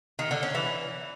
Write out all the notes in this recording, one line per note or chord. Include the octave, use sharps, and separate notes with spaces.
D#3
D3
C#4
E3